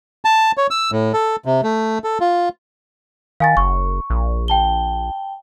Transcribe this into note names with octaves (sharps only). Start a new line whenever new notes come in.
A5
C#5
E6
A2
A4
C3
A3
A4
F4
D#3 F5 G#5 A6
F#1 C#6
A#1
G5 A5 G7